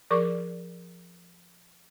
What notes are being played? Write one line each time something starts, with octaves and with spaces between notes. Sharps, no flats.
F3 G#4 A#4 D5 C#6 D6